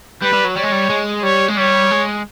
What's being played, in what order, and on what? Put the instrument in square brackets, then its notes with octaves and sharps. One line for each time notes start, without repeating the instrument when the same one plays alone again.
[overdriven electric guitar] G3 [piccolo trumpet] B4
[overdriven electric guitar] G3
F#3
[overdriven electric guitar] G3 [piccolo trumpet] C#5
[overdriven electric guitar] G#3
G3
G#3
[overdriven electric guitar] G3 [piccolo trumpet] C#5
[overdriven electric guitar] G#3
[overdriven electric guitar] G3 [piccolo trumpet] C#5
[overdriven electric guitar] G#3